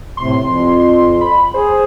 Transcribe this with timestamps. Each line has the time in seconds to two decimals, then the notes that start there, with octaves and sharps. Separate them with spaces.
0.17 A2 C3 C6
0.41 F2
0.79 C6
1.21 B5
1.54 G#4 C5